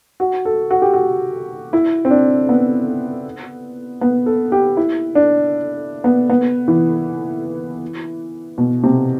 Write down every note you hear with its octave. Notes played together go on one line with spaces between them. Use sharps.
F#4
A4
F#4
G4
F#4
E4
C4
D4
B3
B3
A4
G4
E4
D4
B3
B3
E3
B2
C3